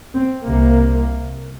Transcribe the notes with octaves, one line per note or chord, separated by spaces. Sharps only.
C4
C2 C3 A#3